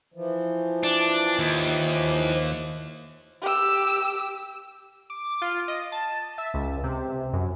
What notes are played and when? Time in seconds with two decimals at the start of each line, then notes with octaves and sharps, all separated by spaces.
0.14 E3 F3
0.83 D4
1.39 D#2
3.42 G4 E6
5.10 D6
5.41 F4
5.68 D#5
5.92 A5
6.38 E5
6.54 C#2
6.83 C3
7.33 F#2